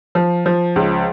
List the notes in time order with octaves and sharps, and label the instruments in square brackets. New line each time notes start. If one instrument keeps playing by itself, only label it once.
[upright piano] F3
F3
C#2